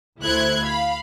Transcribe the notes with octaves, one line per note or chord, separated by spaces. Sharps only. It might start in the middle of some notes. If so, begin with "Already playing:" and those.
D2 A3 E4 C5 F#6 G#6
F5 B5